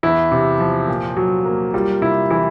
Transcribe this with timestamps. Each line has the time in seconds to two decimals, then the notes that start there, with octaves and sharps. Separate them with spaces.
0.03 E2 E4
0.31 C3
0.60 F3
0.88 A#2
1.17 F#3
1.45 A#3
1.74 G3 F4
2.02 C3 E4
2.30 E3 E4